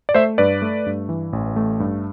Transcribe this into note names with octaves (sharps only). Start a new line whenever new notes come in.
D5
A3 C5 E5
G2 B4 D5
A3
G2
E3
A1
A3
G2